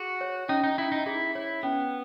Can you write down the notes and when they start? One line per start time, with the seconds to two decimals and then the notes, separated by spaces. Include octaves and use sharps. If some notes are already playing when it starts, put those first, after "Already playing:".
Already playing: F#4 G#4
0.21 C#5
0.49 C#4 D#4
0.64 D#4
0.78 C#4 E4
0.92 D#4
1.06 E4 G#4
1.35 E4 C#5
1.63 B3 C#4